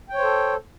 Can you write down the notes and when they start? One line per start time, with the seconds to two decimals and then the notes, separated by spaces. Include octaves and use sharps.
0.09 G5
0.14 C#5
0.18 C5
0.23 A4